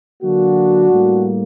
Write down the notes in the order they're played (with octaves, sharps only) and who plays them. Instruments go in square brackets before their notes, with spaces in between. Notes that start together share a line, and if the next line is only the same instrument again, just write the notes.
[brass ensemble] D3 F#3 A#3 D4 F#4
A2 G3 A#3